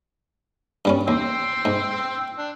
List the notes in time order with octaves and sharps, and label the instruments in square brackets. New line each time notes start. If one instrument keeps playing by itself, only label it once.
[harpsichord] G2 G3 C#4
[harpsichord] D#2 [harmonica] G5 C6 E6
[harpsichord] G#2
[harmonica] D4